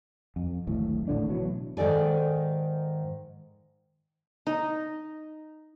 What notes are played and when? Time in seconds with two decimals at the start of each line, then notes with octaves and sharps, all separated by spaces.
0.36 F2
0.67 D1 G#1 A2
1.08 G#1 A2 D3 D4
1.30 B2 E3 F#3
1.77 G#2 D#3 A4 D5 G#5
4.47 D#4